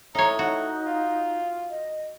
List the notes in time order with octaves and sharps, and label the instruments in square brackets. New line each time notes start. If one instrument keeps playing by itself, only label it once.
[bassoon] A2 [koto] D#4 C#5 [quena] A#5
[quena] D#4 [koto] F#4
[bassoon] F4
[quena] D#5